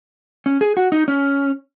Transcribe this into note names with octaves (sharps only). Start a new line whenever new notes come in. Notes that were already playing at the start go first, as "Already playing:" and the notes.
C#4
G#4
F#4
D#4
C#4